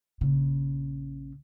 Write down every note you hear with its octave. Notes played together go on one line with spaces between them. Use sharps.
A#1 C#3